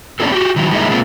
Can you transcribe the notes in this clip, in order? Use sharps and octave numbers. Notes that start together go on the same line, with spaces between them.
B3 C#4 D4 E4 G#4 A4
F#4 G4
D#3 E3 F#3
E3 G3 G#3 A#3 D#4 E4
B2 G#3 A#3 C4 F4